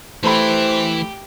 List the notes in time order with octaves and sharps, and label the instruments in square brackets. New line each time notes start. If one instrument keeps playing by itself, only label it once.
[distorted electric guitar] E3 [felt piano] A3 B5 [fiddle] G4 [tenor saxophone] C5